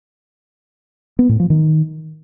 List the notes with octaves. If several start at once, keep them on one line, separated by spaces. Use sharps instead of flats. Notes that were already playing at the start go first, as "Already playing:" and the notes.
B3
A2
F3
D#3